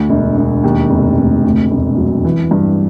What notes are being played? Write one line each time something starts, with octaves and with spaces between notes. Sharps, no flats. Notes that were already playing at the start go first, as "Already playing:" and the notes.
Already playing: D2
E1
E1
D#2
F1
F1
D2
E1
F#3
E3
G2